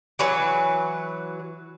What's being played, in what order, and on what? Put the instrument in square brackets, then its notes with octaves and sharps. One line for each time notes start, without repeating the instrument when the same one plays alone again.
[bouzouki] E3 F#3 B4